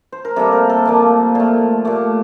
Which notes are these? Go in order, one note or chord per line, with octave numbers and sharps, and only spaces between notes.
C5
A#4
C3 G3 A#3 A4
A#4
A4
A#2 F3 A#3
A#2 A3
A#2 A3 G4